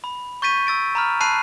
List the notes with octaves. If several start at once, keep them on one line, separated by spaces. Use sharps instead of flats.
B5
C#6 G6 A6 B6 D#7
E6 A6 D7
A#5 B5 F6
A5 B5 F#6 C7 D#7